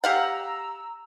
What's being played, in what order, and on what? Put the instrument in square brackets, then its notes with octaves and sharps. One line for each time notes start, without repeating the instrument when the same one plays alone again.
[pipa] G4 F5 F#5 [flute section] A#5 E6